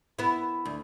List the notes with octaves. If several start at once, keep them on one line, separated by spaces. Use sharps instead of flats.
B3 E4
D2